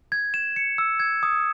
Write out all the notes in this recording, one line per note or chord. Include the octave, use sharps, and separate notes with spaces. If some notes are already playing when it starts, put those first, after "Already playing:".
G#6
E7
C#7
E6
G#6
D#6